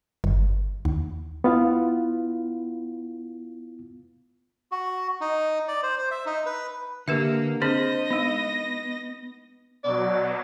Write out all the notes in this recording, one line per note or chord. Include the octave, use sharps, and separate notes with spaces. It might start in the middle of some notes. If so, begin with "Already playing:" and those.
G1
D#2
B3 E4 F4 F5
F#4
D#4
D5
C5
C5
E5
D#4
B4
D3 A#3 G4 B4 E5
C4 D4 G#4 C5 D#5 A#6
G#3 B3 D#4
B2 F#3 D5